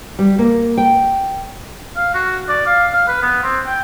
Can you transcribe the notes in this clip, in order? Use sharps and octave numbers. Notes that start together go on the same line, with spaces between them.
G3
A#3
G5
F5
F#4
D5
F5
F5
B4
B3
C4
G5